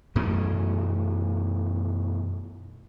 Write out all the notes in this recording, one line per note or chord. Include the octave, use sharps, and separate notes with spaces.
F#2 B2 E3 A3